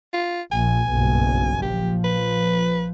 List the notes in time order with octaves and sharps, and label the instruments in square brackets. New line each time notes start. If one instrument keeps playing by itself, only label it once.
[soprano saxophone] F4
[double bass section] A#1 [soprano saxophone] G#5
[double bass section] F#1 B1 G2
[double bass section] A#1 F3 [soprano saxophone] G4
[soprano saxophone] B4